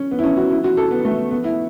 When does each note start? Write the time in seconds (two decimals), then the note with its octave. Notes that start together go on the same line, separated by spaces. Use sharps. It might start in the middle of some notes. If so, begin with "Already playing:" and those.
Already playing: C#4
0.11 B3
0.19 E4
0.24 C#4
0.37 F#4
0.51 E4
0.64 F#4
0.77 A4
0.91 B3
1.05 A3
1.31 B3
1.44 E4